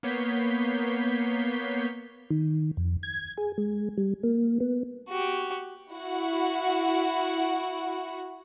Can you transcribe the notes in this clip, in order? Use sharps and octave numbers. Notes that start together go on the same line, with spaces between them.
A#3 B3 C#5 G6 B6 C7
D#3
F2
G#6
G#4
G#3
G3
A#3
B3
F#4 G4
E4 F#4 F#5